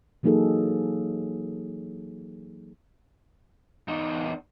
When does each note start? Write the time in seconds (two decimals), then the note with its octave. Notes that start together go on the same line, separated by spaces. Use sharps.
0.23 E3 F#3 A#3 D#4 G#4 A4
3.88 E2 D#4